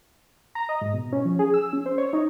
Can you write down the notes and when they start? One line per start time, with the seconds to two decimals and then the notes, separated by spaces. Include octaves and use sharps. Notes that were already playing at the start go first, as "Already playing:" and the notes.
0.55 A#5
0.69 D#5
0.81 G#2
0.93 B2
1.12 C#4
1.25 F3
1.39 G#4
1.54 E6
1.73 C#4
1.86 C5
1.98 C#5
2.13 D#4